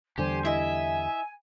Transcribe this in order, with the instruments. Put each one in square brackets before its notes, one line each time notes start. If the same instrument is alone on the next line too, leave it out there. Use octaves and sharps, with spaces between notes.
[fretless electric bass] E2 D3 G3 [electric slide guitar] G4 [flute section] C5 G#5
[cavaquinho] E4 D#5 [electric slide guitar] E5 [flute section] G#5